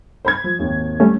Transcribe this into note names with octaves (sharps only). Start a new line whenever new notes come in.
C5 B5 G#6
F3
G#1 D#2
G3 A3 C#4